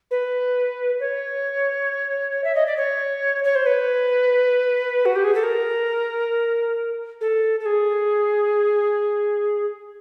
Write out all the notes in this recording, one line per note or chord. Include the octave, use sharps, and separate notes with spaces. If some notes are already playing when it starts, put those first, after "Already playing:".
B4
C#5
E5
D#5
D5
C#5
C#5
C5
B4
F#4
G4
G#4
A4
A#4
A4
A4
G#4